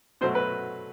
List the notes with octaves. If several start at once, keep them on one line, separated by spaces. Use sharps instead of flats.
B2 F#3 A3 C5
B4